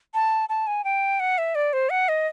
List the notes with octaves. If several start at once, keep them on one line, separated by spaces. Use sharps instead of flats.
A5
A5
G#5
G5
F#5
E5
D5
C5
F#5
D#5